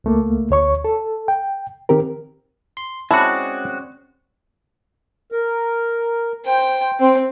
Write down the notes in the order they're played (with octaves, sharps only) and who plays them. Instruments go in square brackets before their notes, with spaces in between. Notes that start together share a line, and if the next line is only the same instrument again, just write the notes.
[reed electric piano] C#2 A3 A#3
D2 C#5 C#6
A4
G5
D#3 C4 G4 A#4
[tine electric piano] C6
[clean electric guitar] G#3 F#4 [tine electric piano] C4 C#4 D5 [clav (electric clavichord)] E4 [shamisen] A5
[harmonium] A#4
[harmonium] C5 [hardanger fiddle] G5
[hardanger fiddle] C4 [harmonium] C5 G5